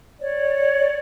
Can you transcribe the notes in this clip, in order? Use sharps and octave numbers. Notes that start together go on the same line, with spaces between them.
C#5 D5